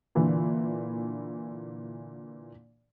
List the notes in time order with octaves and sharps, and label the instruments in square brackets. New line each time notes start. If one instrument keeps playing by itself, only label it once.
[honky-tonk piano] A#2 D3 E3